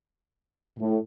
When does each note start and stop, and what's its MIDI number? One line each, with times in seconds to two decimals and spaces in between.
0.79 0.97 45